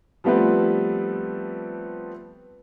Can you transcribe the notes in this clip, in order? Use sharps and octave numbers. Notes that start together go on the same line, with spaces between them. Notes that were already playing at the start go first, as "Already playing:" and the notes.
F3 G3 A3 B3 C4 B4